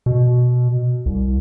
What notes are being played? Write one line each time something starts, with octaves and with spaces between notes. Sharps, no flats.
B2
C2